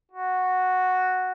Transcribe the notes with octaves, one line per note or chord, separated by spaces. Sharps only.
F#4